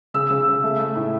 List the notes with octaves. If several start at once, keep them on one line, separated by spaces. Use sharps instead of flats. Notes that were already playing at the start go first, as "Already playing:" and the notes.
C#3 E6
C#3
C#3
A3
A3
A2